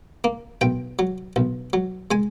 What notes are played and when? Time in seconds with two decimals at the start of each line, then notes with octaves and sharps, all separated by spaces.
0.24 A#3
0.61 B1 G5
0.99 F#3
1.36 B1
1.73 F#3
2.11 G#3 G#5